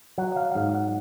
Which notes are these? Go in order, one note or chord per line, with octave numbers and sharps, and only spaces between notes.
F#3 F#5
F5
F#5
G#2 F5
F#5